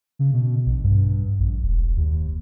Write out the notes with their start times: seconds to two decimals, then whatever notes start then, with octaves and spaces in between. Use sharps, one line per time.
0.19 C#3
0.33 B2
0.66 A#1
0.83 G2
1.39 A#1
1.63 E1
1.97 D#2